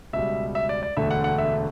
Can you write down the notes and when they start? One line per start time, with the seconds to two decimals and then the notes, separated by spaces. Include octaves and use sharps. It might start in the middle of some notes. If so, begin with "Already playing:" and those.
0.13 C#2 B2 G3 E5
0.55 E5
0.69 D5
0.83 D5
0.97 E1 D2 D3 A3 E5
1.11 F#5
1.24 F#5
1.38 E5